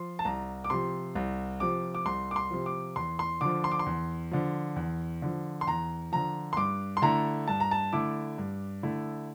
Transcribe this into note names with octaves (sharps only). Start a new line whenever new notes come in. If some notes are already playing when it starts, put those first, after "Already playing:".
Already playing: F3 C6
A5
C2 A#5
D6
C3 F3 C6
C2
C3 F3 D6
D6
C2 C6
D6
C6
C3 F3
D6
E2 C6
C6
D3 F3 D6
C6
D6
C6
E2
D3 F3
E2
D3 F3
C6
E2 A#5
D3 F3 A#5
C6
G2 D6
C6
D3 A3 E4 A#5
G2 A5
A#5
A5
D3 A3 E4 D6
G2
D3 A3 E4